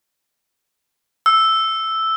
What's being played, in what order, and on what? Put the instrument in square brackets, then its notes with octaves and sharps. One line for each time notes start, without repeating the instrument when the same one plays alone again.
[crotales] E6